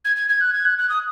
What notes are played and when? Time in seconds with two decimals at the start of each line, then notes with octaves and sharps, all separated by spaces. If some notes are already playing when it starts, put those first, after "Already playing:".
0.05 G#6
0.16 G#6
0.29 G#6
0.41 F#6
0.53 G#6
0.65 F#6
0.78 F#6
0.89 D#6